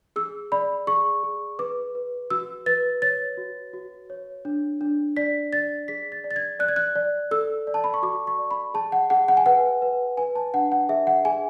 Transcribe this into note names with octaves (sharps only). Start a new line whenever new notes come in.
G#4 E6
D5 B5
G#4 C#6
G#4
B4 D6
B4
F#4 E6
B4 A6
C#5 A6
F#4
F#4
C#5
D4
D4
D5 B6
D5 A6
G#4 B6
A6
D5
A6
G#6
D5 F#6
G#6
F#6
D5
A4 E6
D5
A5
B5
C#6
F#4 D6
C#6
D5
B5
G#4 A5
F#5
G#4 F#5
F#5
G#5
B4 F#5
B4
B4 G#5
A5
D4 F#5
F#5
G#4 E5
F#5
G#4 G#5